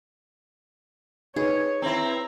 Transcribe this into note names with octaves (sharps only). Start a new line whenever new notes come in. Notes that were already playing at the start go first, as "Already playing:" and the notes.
D#4 G#4 B4 C#5
C4 E4 A#5